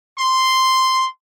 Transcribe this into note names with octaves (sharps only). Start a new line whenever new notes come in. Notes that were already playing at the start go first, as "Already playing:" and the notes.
C6